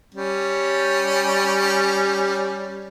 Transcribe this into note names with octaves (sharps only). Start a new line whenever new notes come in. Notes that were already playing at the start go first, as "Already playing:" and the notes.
G3 C#4